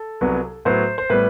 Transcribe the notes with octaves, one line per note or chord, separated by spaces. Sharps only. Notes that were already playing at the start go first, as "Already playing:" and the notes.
Already playing: A4
C2 C3 F#3 B3
A2 F#3 B3 C5
C5
A2 G3 B3 B4